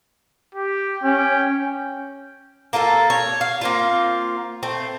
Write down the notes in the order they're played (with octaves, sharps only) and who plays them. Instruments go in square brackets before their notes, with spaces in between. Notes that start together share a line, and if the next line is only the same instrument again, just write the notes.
[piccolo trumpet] G4
[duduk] C#4 [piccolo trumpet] G5
[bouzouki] A#3 F4 G#4 A4
C#5
F5
A#3 C4 F4
A3 C4